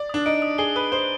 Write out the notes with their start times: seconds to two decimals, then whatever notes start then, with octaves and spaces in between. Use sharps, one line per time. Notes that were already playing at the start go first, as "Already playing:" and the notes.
Already playing: D5
0.09 D4 D#6
0.26 D#4 D7
0.42 D#6
0.58 G#4 G7
0.76 B4 D#6
0.92 C5 G7